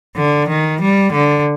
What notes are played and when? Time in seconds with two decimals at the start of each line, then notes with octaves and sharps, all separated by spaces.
0.16 D3
0.48 D#3
0.81 G3
1.12 D3